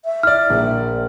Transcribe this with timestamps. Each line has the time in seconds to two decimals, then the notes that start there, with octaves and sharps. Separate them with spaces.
0.05 E5
0.23 E4 D5 F6
0.50 A#1